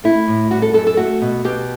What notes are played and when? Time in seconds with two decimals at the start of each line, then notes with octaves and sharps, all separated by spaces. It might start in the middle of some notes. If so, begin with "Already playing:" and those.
0.04 A3 E4
0.27 A2
0.51 G3 F#4
0.62 A4
0.74 F#2 A4
0.87 A4
0.97 A3 F#4
1.22 B2
1.44 B2 G4